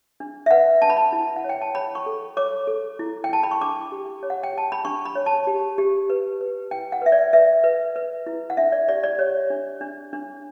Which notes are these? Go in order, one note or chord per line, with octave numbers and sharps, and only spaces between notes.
D4
E5
B4 F#5
D4 A5
B5
A5
E4
F#5
C#5
G5
A5
C#5 B5
C#6
A4
C#5 D6
A4
E4
G5
E4 A5
B5
C#6
D4 D6
G4
C#5
F#5
G5
G4 A5
B5
D4 C#6
B5
C#5
A5
G4
G4
B4
B4
E4 G5
F#5
B4 E5
D5
B4 E5
B4
B4
E4
F#5
D4 E5
D5
G4 D5
D5
G4 C#5
D4
D4
D4